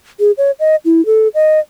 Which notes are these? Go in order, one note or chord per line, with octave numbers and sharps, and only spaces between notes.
G#4
C#5
D#5
E4
A4
D#5